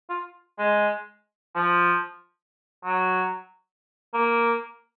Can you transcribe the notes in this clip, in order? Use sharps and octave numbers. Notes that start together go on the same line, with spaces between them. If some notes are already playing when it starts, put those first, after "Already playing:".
F4
G#3
F3
F#3
A#3